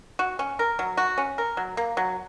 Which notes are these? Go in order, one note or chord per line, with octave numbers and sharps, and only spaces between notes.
F#4
C#4
A#4
F#3
F#4
C#4
A#4
F#3
A#3
F#3